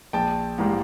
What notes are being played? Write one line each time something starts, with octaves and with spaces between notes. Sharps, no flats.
A#1 G5 A5
G#2 E3 G3 A#3